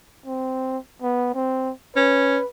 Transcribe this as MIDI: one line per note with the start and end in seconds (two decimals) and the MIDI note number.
0.26 0.78 60
1.02 1.31 59
1.35 1.72 60
1.96 2.38 61
1.96 2.47 71